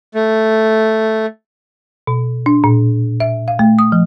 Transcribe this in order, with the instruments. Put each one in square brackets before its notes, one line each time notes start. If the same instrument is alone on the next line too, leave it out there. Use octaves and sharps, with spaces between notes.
[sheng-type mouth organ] A3
[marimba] B2
D4
A#2
E5
F5
A3
D#6
F3